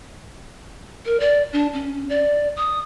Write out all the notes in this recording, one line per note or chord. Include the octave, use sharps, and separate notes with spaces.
A#4
D5
D4
C#4
D5
D#6